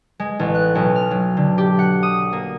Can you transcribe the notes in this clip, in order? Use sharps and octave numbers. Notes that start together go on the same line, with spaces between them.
G#3
A1
F#6
B1
F6
F#3
D3
G4
F#5
D#6
A#3